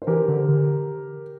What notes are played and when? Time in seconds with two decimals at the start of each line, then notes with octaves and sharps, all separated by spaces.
0.02 C5
0.07 E3 G4 A#4
0.28 D3
0.48 D3